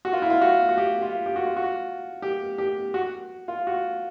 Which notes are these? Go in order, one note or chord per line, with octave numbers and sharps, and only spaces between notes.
F#4
F4
E4
F4
F#4
F#4
G4
F4
G4
F#4
F4
F#4
G4
G4
F#4
F4
F#4